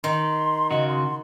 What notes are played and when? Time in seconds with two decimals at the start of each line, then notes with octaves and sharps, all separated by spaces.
0.04 D#3 C6
0.71 C#3 F#4 D#5
0.88 C6